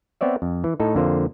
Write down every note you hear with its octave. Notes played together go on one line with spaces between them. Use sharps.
B3 C4 C#5 D5 E5
F2
E3
A2 D#4 A4
F2 D3 A#3 F4 C5